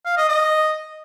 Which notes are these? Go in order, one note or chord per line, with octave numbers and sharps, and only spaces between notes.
F5
D#5
D#5